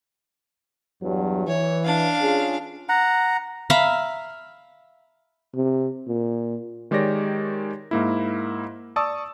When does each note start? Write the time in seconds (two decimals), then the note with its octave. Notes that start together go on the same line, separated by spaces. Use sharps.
1.03 E2 G2 F#3
1.47 E3 C#5
1.85 D4 F5
2.22 C#4 F4 G#4
2.89 F#5 A#5
3.70 E5 F5 A#5 B5
5.55 C3
6.08 A#2
6.91 D#3 G#3 G4 C#5 D5 A#6
7.91 G#2 A#3 E4
8.96 D5 A5 C#6 D#6 E6